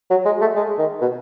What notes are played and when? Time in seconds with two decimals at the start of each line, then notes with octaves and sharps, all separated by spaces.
0.10 F#3
0.25 G#3
0.41 A3
0.55 G#3
0.78 D#3
1.01 B2